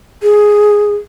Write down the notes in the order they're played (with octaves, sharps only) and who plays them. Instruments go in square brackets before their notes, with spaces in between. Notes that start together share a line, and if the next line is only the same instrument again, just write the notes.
[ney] G#4